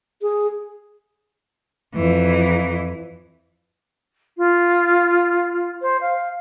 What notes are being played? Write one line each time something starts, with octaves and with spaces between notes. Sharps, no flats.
G#4
F2 E3
F4
C5
F5